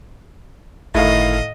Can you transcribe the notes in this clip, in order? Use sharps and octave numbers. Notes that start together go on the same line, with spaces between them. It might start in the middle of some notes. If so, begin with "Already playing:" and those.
G1 A2 D#3 E4 A4 D#5 F5